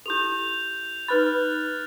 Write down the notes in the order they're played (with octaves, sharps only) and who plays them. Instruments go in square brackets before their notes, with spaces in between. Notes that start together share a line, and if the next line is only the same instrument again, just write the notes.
[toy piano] E4 G4 A4 [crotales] G6 F7
[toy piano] D#4 B4 B5 [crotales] F6 F#6 A6